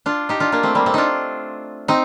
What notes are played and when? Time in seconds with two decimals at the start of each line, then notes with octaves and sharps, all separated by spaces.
0.06 D4 F4
0.29 D#4 G4
0.40 D4 F4
0.52 A#3 D4
0.63 A3 C4
0.75 G3 A#3
0.86 A3 C4
0.94 D4 D#4 F4
1.88 C4 D#4